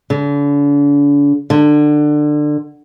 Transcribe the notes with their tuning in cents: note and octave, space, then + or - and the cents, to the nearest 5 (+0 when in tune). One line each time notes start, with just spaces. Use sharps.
D3 -40
D3 +20